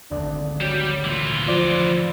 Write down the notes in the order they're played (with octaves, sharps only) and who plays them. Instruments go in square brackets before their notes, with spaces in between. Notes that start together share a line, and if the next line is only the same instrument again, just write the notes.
[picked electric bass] G#1 D2 [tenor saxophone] D4
[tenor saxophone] F#3 [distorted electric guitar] G3 G4
[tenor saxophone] A#2 [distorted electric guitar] E3 F4
[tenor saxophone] F3 [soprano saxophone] D5